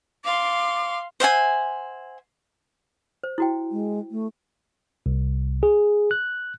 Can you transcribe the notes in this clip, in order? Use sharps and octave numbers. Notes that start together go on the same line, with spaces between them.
F5 C6 D6
C5 E5 F#5 G#5
C5
E4 F#4 G5
G#3
A3
C2
G#4
F#6